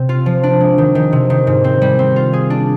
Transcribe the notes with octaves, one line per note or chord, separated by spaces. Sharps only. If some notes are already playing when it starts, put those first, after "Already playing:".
Already playing: C3 C4
F4
F3
D4
G#3
D#3
D#3
C3
D#3
G#2
C4
G3
C4
F4
G#4
D4